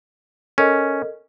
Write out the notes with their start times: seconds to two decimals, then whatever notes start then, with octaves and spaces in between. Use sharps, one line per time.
0.58 C#4 A4 A#4 D#5